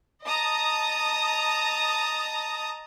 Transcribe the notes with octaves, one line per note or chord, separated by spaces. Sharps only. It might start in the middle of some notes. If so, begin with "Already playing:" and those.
D#5 A5 A#5 D#6